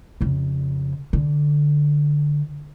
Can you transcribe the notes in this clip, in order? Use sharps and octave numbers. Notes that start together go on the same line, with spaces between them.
F2 C#3
D3